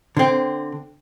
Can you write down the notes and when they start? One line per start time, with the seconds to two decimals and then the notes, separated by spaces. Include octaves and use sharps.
0.17 D3 C4